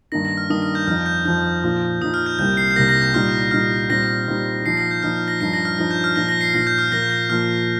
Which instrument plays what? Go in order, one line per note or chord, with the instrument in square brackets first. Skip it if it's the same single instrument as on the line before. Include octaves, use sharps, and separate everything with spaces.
[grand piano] G2 D#3 A#3 D#4 [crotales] A#6
[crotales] A#6
F6
[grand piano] G2 D#3 A#3 D#4 [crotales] D#6
[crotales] F6
G6
[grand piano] F2 F3 D#4 [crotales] F6
[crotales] G6
[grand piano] F2 F3 D#4 [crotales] G6
[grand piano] A#2 F3 D#4
[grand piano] A#2 F3 D#4 [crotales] D#6
[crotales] F6
G6
[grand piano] C2 C3 G3 A#3 [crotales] G6
[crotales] C7
G6
[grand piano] C2 C3 G3 A#3 [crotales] A#6
[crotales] A#6
G6
[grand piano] A#2 G3 D#4 [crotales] F6
[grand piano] A#2 G3 D#4 [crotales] F6
[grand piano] A#2 G3 C4 D#4 [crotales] A#6
[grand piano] A#2 G3 C4 D#4
[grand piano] A#2 F3 D#4 [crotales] C7
[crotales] A#6
G6
[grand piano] A#2 F3 D#4 [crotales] F6
[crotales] F6
A#6
[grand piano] G2 F3 D#4 [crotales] C7
[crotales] A#6
F6
[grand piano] G2 F3 D#4 [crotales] A#6
[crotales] G6
F6
[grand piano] A#2 F3 D#4 [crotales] A#6
[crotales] A#6
C7
[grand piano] A#2 F3 D#4 [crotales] A#6
[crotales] G6
F6
[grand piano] A#2 F3 A#3 [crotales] A#6
[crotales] G6
A#6
[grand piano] A#2 F3 A#3 [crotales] F6